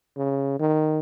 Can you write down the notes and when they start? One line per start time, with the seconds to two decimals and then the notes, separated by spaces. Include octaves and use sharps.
0.17 C#3
0.60 D#3